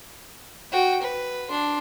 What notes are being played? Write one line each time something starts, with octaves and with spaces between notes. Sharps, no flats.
F#4 G5
B4
D4 C6